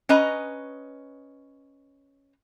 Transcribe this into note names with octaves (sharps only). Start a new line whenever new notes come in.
C#4 B4 D#5 A#5